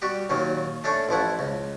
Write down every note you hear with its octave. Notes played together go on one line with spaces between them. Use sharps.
G3 F#4 G4
D#2 A#2 D#3 F#3
A3 C#4 D4 A4
A1 F3 E4 F#5
C#2